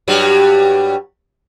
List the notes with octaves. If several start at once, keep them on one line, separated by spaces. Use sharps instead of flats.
G2 F#3 G3